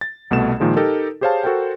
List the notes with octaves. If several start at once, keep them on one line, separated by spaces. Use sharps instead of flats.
A6
C2 B2 A3 E7
A#2 D#3 F3 G#3
D#4 G4 A4 A#4
G4 G#4 C5 C#5 F5 A5
F#4 A4 A#4 C5 G5